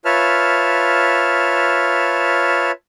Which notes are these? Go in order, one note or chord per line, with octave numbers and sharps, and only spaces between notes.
F4 B4 C#5 E5 A5 F6